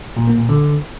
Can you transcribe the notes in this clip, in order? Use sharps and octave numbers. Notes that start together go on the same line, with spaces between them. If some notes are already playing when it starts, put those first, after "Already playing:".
A#2
A#3
A#2
D3